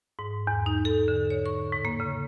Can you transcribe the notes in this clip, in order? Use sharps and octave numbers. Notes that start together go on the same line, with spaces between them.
G#2
E2
D#4
A4
D3
C#5
C#6
A2
A#3
C#3